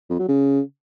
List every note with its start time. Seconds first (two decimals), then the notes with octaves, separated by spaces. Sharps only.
0.10 F2
0.19 F#3
0.28 C#3